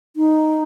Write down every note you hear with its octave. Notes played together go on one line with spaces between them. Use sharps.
D#4